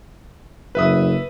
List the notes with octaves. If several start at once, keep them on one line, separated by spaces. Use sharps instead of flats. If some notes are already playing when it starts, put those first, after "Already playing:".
F#1 B4 E5 D#6